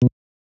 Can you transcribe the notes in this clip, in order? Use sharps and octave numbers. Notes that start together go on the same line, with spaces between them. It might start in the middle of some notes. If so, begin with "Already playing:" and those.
B2